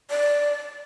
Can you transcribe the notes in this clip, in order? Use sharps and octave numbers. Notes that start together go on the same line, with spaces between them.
D5